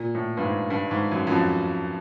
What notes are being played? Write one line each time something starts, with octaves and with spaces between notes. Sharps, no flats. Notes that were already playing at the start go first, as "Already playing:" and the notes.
Already playing: A#2
A2
G2
G#2
G2
G#2
F#2
F#2
F2